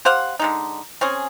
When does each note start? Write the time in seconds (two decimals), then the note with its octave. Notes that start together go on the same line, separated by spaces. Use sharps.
0.05 G4 C5 F5 F#5
0.39 D3 G#3 D#4
1.01 C4 C#4 G#4